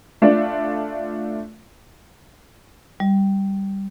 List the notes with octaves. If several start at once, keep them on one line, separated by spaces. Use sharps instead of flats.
A3 D4 F4 D5
G3